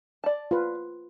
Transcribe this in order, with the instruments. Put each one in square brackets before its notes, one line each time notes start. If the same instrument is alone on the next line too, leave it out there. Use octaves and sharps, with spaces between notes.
[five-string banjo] D5 A5
[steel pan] F4 B4